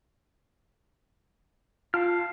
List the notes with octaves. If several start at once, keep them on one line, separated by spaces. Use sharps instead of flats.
F4 F5 A5 F6